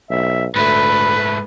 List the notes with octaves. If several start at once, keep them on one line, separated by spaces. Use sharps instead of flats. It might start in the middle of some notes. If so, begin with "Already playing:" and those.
B1 E5
D2 G#2 A3 B4 B5